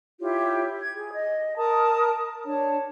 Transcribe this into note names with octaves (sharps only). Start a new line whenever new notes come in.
E4 F4 G4 C#5
G#6
G#4
D#5
A#4 A5 A#5 D#6
D4 C#5 A5